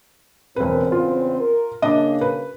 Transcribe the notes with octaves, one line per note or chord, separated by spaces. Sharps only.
E1 E2 C#3 C4 B4
F4
A#4
C#3 A#3 D4 D#5
B4